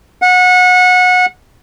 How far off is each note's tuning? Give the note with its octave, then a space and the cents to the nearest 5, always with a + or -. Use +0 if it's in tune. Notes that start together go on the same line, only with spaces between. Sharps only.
F#5 -25